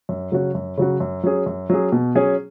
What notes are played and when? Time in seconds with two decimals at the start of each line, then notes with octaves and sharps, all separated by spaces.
0.09 F#2
0.31 C#3 F#3 C#4 F#4
0.55 F#2
0.77 C#3 F#3 C#4 F#4
1.00 F#2
1.24 F#3 C#4 G#4
1.46 F#2
1.70 F#3 C#4 G#4
1.92 B2
2.15 F#3 C#4 G#4